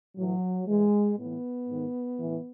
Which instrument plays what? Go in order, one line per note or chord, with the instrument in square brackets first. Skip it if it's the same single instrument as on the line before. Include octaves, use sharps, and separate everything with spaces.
[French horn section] A2 E3 F#3
A2 E3 G#3
A2 E3 B3
G#2 D#3
A2 E3